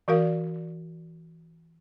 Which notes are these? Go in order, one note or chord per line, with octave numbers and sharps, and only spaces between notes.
E3 F#4 A#4 D5 F5